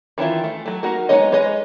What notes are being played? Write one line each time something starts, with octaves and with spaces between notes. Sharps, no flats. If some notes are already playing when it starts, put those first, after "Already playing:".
D#3 E3 D4 E4 F4
A3
F#3 A3
A#3 D#4 F#4 A#4
G#3 B3 D#4 C#5 D#5
G#3 B4 C#5 D#5